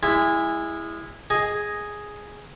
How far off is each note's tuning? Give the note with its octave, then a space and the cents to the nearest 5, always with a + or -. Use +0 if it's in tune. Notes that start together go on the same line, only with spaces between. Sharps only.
G#3 -25 E4 +0
G#4 +0 D#5 +0